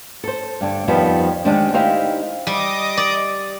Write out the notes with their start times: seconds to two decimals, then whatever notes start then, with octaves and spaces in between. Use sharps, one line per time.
0.24 A4 C5
0.61 G2 D3
0.88 F2 D#3 F3 G3 B3
1.45 D3 D#3 G#3 D4 G4 C5
1.73 D#4 E4 G4 C5 D#5 F5
2.47 G3 D#5 D6 D#6
2.97 D5